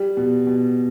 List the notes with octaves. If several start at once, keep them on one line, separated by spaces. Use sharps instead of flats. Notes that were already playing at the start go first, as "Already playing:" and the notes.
Already playing: G3
B2
B2